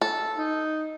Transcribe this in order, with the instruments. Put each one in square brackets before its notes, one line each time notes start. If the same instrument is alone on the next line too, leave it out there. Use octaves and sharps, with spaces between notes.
[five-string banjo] A4
[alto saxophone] D#4